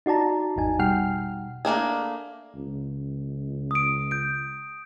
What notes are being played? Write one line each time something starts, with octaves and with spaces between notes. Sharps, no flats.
D#4 F#4 D5 A5 A#5
G#1 E2 D#4 G#5
B2 G3 F#5 G5 F6 C7
A3 A#3 D4 G#4
C#2
D#6 D7
G6 D7